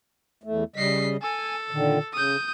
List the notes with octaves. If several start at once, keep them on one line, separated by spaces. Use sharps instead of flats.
E2 A3
C#3 G3 D#5 B6 C7
A4 G#5
A#2 D3 D#3
C#3 D#6 G6